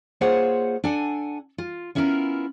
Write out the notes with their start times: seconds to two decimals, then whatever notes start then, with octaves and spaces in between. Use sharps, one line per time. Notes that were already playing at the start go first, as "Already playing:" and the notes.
0.21 A#3 F4 G#4 C5 C#5 F#5
0.84 D4 A4 F#5 G#5
1.58 F4
1.95 B3 C#4 E4 F4 G#4 A#4